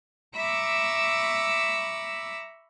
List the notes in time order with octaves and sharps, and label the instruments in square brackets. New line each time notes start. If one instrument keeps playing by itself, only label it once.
[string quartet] E5 A#5 B5 C#6 D6 E6